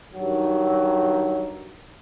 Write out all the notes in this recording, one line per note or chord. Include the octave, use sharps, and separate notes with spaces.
G2 D#3 F#3